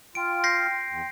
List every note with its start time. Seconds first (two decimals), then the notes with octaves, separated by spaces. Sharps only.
0.15 F4 G5 C6 D7
0.44 G6 A#6 C7
0.89 E2